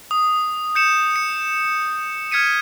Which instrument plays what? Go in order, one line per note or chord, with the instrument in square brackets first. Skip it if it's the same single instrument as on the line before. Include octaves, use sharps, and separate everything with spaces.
[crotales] D#6
G6 C#7 E7
C#7
F6 G#6 B6 C#7 D#7